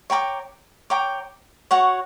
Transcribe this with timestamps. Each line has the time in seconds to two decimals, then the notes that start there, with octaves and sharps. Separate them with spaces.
0.10 C#5 G5 A#5 D6
0.90 C#5 G5 A#5 D6
1.71 F#4 C#5 F#5